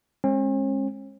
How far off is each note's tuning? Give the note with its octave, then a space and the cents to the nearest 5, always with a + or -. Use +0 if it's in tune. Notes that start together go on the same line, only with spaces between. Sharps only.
G#3 +0 C#4 -45